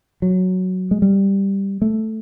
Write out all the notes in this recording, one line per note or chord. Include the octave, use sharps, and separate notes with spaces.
F#3
G#3
G3
A3